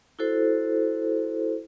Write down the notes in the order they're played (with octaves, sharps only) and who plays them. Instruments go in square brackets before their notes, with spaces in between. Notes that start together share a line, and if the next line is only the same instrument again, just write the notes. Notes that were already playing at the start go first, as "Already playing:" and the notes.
[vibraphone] E4 F#4 A4 C5